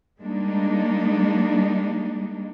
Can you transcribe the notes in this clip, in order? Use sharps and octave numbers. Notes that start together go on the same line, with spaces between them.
G3 G#3 A#3 D4 D#4